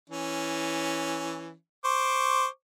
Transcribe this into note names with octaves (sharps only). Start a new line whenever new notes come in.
E3 C#4
C5 C#6 D6